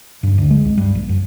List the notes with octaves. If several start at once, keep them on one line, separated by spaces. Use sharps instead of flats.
G2
D2
G#3
C2
G2
A#1
F#2